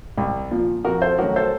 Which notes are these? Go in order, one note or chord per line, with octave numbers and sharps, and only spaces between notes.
C2
A#2 F3
F2 F#4 A#4
A4 C5
D#3 F#3 A3 C#4 F#4 A#4
A4 C5